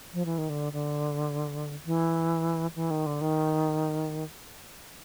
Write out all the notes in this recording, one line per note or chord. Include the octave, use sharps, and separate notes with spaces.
F3
E3
D#3
D3
D3
E3
E3
D#3
D3
D#3